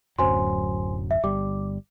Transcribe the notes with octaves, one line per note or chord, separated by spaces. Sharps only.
D1 F#2 F#3 C5 G#5 C6
E5
G1 G3 D6